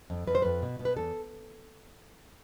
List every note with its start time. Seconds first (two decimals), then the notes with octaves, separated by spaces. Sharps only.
0.10 F2
0.27 F2 B4
0.35 C5
0.42 F2 B4
0.62 B2
0.79 B2
0.85 B4
0.97 E2 A4